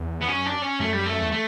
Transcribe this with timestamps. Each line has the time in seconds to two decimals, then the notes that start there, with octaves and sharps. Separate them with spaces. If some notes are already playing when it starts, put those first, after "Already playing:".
Already playing: E2
0.22 B3
0.28 F#2 C#4
0.46 D4
0.62 C#4
0.80 F#2 A3
0.93 G3
1.06 A3
1.21 E2
1.32 A3